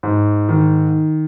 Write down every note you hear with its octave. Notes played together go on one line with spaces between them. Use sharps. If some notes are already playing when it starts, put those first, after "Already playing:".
G#2
D#3